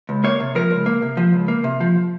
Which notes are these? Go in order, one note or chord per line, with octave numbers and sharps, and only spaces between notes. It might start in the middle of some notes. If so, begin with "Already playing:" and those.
C#2
A#3 C#5
C3
F3 A#4
C#2
A#3
C3
F3
C#2
A#3
C3
F3